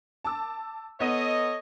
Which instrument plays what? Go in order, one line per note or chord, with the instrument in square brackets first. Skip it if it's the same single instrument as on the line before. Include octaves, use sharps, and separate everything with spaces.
[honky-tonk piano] A5 D6 E6
[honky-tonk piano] B3 [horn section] A4 C#5 D#5